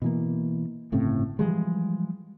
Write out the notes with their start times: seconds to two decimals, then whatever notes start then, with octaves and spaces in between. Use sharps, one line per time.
0.02 B2 E3 A#3
0.92 G1 A2 C#3 C4
1.39 E3 F3 G3 G#3